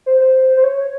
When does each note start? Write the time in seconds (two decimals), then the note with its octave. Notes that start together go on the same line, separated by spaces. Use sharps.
0.06 C5
0.21 C5
0.57 C5
0.64 C#5